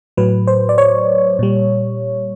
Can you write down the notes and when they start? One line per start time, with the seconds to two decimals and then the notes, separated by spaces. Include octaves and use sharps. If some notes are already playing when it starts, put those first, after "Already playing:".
0.17 A2 F#3 B4
0.47 C5
0.69 D5
0.78 C#5
1.39 A#2 G3